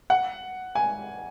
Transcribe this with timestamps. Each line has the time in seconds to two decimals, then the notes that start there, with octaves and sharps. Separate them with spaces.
0.10 F#5
0.75 G#5